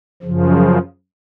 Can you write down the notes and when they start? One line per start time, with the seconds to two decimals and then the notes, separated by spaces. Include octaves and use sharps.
0.23 F#2 C#3 F3